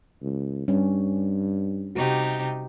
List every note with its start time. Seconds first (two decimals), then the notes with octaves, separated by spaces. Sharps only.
0.22 C#2
0.68 G2 G3 C#4
1.95 C3 D#4 F#4 G4